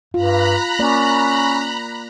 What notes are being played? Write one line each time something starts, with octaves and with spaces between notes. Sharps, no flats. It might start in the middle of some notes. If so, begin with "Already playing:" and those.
G2 F4 A#5 B5 F#6
A#3 C#4 D5